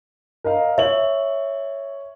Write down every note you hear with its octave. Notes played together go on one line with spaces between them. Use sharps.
A#4 D#5 F5
C#5 E5 F#7